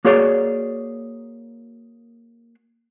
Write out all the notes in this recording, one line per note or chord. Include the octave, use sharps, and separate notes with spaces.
A#3 F#4 G#4 C#5 D5